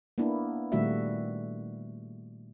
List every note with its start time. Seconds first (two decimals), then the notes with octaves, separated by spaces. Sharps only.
0.18 A#3 B3 D4 E4
0.72 A#2 D#3 G3 A3 F#4 E5